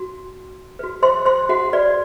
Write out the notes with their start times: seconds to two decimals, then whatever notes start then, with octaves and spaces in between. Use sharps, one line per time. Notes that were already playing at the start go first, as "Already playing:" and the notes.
Already playing: F#4
0.79 F#4 B4
1.03 C5 C6
1.25 C5 C6
1.49 F#4 F#5
1.73 F#4 B4 D5